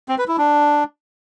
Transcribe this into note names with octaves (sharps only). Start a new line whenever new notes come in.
C4
B4
E4
D4